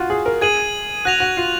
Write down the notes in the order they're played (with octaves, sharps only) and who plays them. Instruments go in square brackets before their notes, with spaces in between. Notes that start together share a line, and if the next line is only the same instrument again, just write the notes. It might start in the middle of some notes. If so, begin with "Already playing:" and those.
Already playing: [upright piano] F4 F#4
G#4
A#4
[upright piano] G#4 [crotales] G#6 D#7 F#7
[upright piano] F#4 [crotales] F#6 A#6 F7
[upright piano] F#4
F4